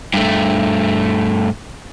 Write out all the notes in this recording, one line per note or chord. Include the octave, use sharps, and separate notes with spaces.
G2 A3